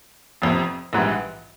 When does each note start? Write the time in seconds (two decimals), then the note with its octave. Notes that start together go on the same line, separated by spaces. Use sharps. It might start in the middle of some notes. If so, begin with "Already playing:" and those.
0.42 F1 F2 C3
0.93 A#1 G#2 E3 G3